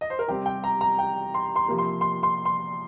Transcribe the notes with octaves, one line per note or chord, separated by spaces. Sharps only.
D#5
C5
A#4
C3 G3 C4 G4
G5
A#5
A#5
G5
C6
C6
C3 F3 A#3
C6
C6
C6
C6